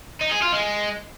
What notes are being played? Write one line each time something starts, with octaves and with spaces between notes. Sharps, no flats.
D#4
G#4
F4
G#3